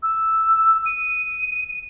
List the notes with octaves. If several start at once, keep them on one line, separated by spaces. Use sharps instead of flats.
E6
D#7